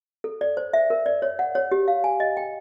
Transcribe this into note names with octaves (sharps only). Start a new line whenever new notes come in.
A4
D5
C5
E5
A#4
D5
C#5
F#5
C#5
G4
F5
G#5
D#5
G5